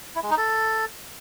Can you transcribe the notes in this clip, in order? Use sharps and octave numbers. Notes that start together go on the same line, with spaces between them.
E4
G#3
D#4
A4